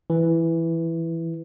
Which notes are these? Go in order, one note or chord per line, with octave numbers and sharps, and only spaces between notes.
E3